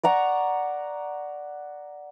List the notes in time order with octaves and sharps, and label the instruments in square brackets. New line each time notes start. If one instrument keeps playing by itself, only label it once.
[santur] D5 F#5 A#5 C#6